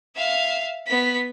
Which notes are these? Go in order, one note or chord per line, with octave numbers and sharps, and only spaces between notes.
E5 F5
B3 B6